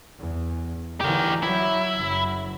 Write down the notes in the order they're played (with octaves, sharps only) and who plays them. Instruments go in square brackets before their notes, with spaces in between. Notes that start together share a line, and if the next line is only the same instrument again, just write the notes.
[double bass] E2
[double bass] D3 E3 [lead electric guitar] G4 A#4
[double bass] F#3 [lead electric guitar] E4
[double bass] F#1 F#3